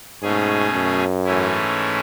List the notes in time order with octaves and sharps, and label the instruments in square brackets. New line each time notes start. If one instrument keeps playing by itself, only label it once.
[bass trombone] G#2 [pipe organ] B2 A3 C#4 G#4
[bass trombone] F#2
[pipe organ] G#2 E3 A3 C#4 E4